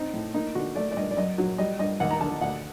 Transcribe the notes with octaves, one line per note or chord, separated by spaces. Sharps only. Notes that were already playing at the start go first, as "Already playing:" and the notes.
Already playing: C4 D#4
A2
A#3 D#4
D3 F#4
A3 D5
D5
G2 D#5
D5
F#2 D#5
F#3
G3 D#5
G2 D#5
D#2 F#5
A#5
D3 A5
D2 F#5